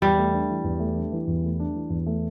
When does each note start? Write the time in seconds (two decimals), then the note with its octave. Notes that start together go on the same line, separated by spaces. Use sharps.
0.02 E2 G3
0.18 A3
0.34 D4
0.50 E3
0.64 E2
0.80 A3
0.97 D4
1.12 E3
1.27 E2
1.44 A3
1.60 D4
1.75 E3
1.90 E2
2.07 A3